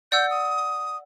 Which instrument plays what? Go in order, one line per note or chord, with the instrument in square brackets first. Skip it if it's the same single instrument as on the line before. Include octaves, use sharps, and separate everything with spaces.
[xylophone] D5 F#5 E6 [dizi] G6
[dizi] D#6